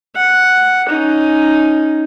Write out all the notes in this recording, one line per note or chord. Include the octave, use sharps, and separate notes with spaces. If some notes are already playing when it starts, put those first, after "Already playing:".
F#5
C#4 D#4